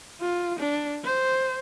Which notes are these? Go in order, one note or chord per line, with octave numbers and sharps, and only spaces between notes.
F4
D4
C5